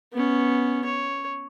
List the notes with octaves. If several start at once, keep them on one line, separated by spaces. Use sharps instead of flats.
B3 C#4
C#5